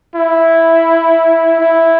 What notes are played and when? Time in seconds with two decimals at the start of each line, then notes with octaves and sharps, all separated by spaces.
0.16 E4
1.61 E4